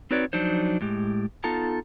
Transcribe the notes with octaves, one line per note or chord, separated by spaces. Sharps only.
C4 D#4 F#4 B4 C#5 D5
F3 F#3 D4 D#4 C5
A2 G#3 G4
B3 D#4 F4 A4 A5 A#5